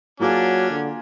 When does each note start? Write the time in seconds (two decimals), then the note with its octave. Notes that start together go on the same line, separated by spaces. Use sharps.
0.20 F#3 A#3 C#4 D4 F4 G#4
0.70 D3